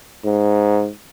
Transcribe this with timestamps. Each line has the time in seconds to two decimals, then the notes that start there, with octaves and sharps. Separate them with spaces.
0.24 G#2